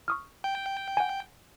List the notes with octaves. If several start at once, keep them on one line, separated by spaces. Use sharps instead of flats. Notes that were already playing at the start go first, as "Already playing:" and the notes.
C#6 D#6 F6
G5
F#5 G#5